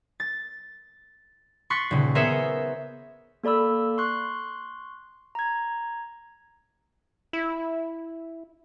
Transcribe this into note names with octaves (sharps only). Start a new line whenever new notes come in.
A6
C6 C#6 F#6 A6 B6
D#1 C#3
B3 G#4 A#4 C5 C#5 E5
A#3 A4 D5 B5 E6
C6 C#6 F#6
A#5 G#6
E4